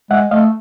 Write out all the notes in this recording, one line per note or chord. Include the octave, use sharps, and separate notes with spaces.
G#3 E5 F#5
A3 D#5 F5